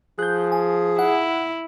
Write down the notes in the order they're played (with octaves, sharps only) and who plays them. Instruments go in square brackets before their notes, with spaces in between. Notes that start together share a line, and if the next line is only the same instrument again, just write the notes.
[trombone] F3 [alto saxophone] G#4 [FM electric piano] F#6 G6
[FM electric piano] G#5
[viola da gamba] E4 [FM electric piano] F#5